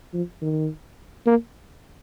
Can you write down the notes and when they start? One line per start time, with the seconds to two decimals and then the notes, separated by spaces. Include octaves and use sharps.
0.14 F3
0.42 D#3
1.26 A#3